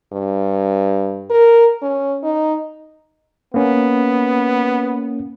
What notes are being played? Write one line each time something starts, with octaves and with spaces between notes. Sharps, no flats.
G2
A#4
C#4
D#4
A#3 B3 C#4